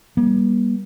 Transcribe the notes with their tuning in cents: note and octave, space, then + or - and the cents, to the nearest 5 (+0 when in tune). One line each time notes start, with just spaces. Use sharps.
G3 +0 A#3 +40